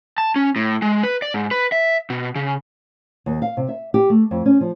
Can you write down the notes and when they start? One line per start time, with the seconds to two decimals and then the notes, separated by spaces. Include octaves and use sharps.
0.18 A5
0.36 C#4
0.56 A2
0.82 G#3
1.03 B4
1.22 D5
1.34 G#2
1.51 B4
1.72 E5
2.10 B2
2.35 C#3
3.26 D#2
3.42 F5
3.57 C3
3.69 E5
3.94 G4
4.10 A3
4.31 F2
4.46 C#4
4.61 F3